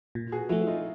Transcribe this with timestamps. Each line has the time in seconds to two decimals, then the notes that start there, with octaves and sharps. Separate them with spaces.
0.15 A#2
0.32 F#4 G#4
0.49 F3 A3 E4 F#4
0.67 D#4 F4